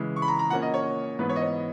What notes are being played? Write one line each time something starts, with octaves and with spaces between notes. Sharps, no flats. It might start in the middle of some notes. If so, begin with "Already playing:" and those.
Already playing: C#3 E3 G#3
C#6
B5
A#5
A#5
A#2 A#3 C#4 F#5
D#5
C#5
G#2 E3 B3 B4
C#5
D#5
C#5